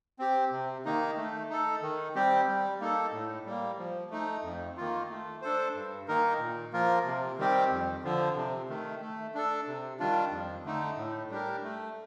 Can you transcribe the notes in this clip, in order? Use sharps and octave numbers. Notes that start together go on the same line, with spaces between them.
C4 G4
C3
D#3 A#3 D#4
A3
D#4 A4
D#3
G3 C4 G4
G3
A#3 D#4 A4
A2
G3 A#3
F3
A3 D#4
F2
D#3 A#3 F4
A3
D4 A4 C5
G2
D#3 A#3 D#4 A#4
A#2
F3 A#3 F4 A#4
C3
D#3 G3 C4 G4
F2
D3 F3
C3
D#3 A3
A3
D4 A4
C3
D#3 G3 D4 F4
F2
D3 A3 D#4
A2
G3 D4 G4 A#4
A3